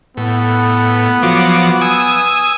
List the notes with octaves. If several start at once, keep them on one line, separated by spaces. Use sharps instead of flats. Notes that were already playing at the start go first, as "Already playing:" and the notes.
A2 B3
F3 F#3 D6
G#5 D#6 E6